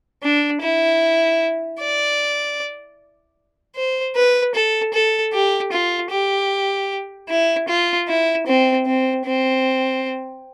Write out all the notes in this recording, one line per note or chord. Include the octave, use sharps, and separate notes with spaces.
D4
E4
D5
C5
B4
A4
A4
G4
F4
G4
E4
F4
E4
C4
C4
C4